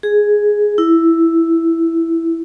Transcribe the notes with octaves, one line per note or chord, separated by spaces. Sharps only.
G#4
E4